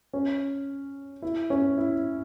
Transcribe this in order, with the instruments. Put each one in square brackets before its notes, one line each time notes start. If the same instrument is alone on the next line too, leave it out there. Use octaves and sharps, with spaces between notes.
[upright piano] C#4
E4
C#4
E4